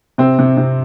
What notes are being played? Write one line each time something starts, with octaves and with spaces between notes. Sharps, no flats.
C3 C4
C3
C3